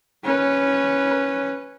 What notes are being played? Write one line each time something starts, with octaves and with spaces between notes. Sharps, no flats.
C#4 B4